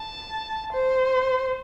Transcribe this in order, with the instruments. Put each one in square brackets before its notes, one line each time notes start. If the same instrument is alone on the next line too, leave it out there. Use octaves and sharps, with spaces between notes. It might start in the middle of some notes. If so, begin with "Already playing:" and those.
Already playing: [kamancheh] A5
C5